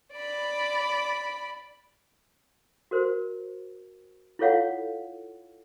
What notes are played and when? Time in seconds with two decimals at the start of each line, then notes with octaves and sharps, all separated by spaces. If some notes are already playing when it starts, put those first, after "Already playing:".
0.13 D5 B5
2.91 F#4 A#4 C5
4.39 E4 F4 A4 C#5 F5 F#5